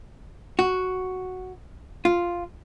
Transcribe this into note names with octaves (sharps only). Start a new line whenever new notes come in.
F#4
F4